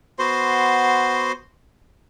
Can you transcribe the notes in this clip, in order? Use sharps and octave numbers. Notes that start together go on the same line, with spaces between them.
B3 F#4 C5 C6